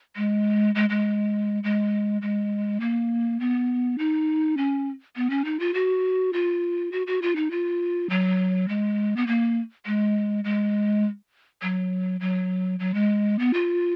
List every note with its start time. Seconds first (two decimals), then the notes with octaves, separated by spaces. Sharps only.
0.16 G#3
0.75 G#3
0.90 G#3
1.64 G#3
2.22 G#3
2.80 A#3
3.40 B3
3.98 D#4
4.57 C#4
5.16 B3
5.30 C#4
5.45 D#4
5.60 F4
5.74 F#4
6.33 F4
6.92 F#4
7.07 F#4
7.22 F4
7.36 D#4
7.51 F4
8.10 F#3
8.69 G#3
9.17 B3
9.27 A#3
9.86 G#3
10.44 G#3
11.62 F#3
12.20 F#3
12.79 F#3
12.94 G#3
13.39 B3
13.53 F4